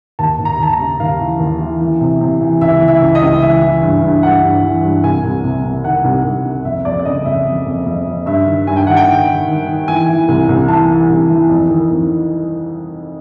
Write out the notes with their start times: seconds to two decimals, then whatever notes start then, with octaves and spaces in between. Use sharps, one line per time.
0.19 D#2 A5
0.39 D#2
0.45 A#5
0.59 D#2 A5
0.73 A#5
0.79 C#3
1.00 D#2 F5
1.20 E3
1.40 D#2
1.60 E3
1.81 E3
2.01 C3
2.21 C3
2.41 E3
2.61 C#2 E5
2.81 E3
2.88 E5
3.02 C#2
3.15 D#5
3.22 C#2
3.41 E3 E5
3.62 E3
3.82 G2
4.02 G2
4.23 G2 F#5
4.43 G2
4.63 E3
4.83 G2
5.04 C2 G#5
5.24 C2
5.44 C3
5.64 C3
5.84 D#3 F#5
6.04 C2
6.25 C2
6.45 C2
6.65 F2 E5
6.85 F2 D5
7.00 D5
7.05 C#3 D#5
7.25 F2 E5
7.45 F2
7.66 F2
7.86 F2
8.06 F2
8.26 G2 E5
8.46 D#3
8.67 G2 G#5
8.76 G5
8.87 D#3 F#5
8.97 G5
9.08 D#3
9.28 D#3
9.48 D#3
9.68 D#3
9.88 E3 G#5
10.08 E3
10.28 C2
10.49 C2
10.68 E3 A5
10.89 E3
11.10 C2
11.29 E3
11.49 F2
11.70 D#3
11.90 F2